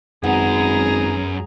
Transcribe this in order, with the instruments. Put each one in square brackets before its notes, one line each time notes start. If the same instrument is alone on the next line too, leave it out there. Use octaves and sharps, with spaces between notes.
[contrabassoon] G#1 [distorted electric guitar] F#2 [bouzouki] B3 [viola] G#4 A#5